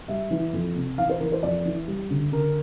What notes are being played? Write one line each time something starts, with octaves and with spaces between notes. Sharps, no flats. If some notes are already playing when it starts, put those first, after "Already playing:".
G3 E5
E3
F2
C3
E3 F5
C5
E3 A#4
C5
F2 D5
E3
G3
D3
D3 A#4